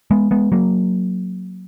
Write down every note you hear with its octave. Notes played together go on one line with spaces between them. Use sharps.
G#3 B3
G#3 B3
F#3 A#3